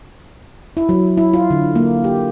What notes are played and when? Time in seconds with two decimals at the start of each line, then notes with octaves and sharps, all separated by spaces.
0.77 E4
0.89 F#3
1.17 E4
1.34 F4
1.50 D3
1.75 A#3
2.04 G4